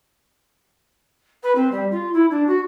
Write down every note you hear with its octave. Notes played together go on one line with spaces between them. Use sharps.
B4
C4
G3
F4
E4
D4
F#4